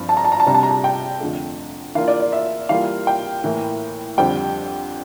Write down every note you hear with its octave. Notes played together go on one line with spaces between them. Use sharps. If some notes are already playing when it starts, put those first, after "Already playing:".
Already playing: G2 F3 C4
A5
A#5
A5
A#5
A5
C3 G3 D4 A#5
A5
A#5
A5
G5
F2 D3 A3
E3 A#3 D4 F4 F5
D5
D5
E5
E3 G3 A#3 F4 F5
G5
A2 E3 A#3
F2 D3 G3 C4 G5